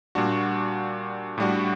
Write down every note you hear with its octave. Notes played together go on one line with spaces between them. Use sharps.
A#2 G3 D4 F#4
A2 G3 D4 F#4